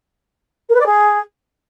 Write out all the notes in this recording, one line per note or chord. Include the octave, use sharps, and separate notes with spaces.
A#4
B4
D5
G#4